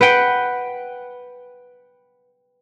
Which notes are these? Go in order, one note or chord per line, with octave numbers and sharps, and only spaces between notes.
B4 F#5 G5